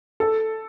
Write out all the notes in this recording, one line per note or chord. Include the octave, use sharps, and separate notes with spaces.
A4